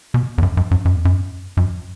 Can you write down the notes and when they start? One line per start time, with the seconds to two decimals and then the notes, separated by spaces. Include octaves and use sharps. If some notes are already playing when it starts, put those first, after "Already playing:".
0.14 B2
0.38 E2
0.43 F#2
0.57 F#2
0.71 F#2
0.85 F#2
0.96 E2
1.05 F#2
1.57 F#2